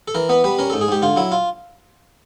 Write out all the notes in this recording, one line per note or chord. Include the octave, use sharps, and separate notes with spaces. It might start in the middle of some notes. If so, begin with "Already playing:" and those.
A4
E3 A#4
B3 B4
G3 B4
C#4 A#4
G#2 A4
G#4
G#2 G4
D3 F4
F#3 E4
F4